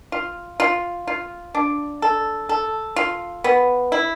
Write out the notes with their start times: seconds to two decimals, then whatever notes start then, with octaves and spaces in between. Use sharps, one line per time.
0.12 F4
0.60 F4
1.07 F4
1.55 D4
2.02 A4
2.49 A4
2.96 F4
3.44 B3
3.92 E4